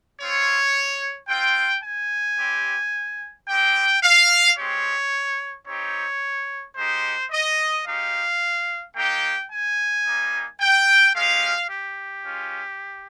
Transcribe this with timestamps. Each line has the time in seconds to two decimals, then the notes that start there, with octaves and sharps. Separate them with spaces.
0.18 C4 F4 C#5
1.28 C4 F4 G5
1.83 G#5
2.38 G3 C4 G4
3.47 G#3 C4 G4 G5
4.02 F5
4.57 G#3 C4 G4 C#5
5.67 C4 D#4 G4 C#5
6.76 G#3 D#4 G4 C5
7.31 D#5
7.85 G#3 D#4 G4 F5
8.95 A#3 D#4 G4 G5
9.50 G#5
10.04 G3 A#3 D#4
10.59 G5
11.15 G#3 C#4 G4 F5
11.69 G4
12.24 G#3 C#4 F4